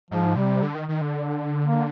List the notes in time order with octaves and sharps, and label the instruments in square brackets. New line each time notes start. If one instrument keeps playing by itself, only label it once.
[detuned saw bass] G#2 [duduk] F3
[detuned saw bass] C3 [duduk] G3
[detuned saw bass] D3
D#3
D#3
D3
[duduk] A#3